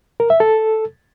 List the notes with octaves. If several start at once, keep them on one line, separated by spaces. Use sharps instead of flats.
A#4
E5
A4